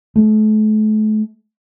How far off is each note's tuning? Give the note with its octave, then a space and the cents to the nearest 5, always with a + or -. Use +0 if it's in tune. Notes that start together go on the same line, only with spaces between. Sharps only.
A3 -40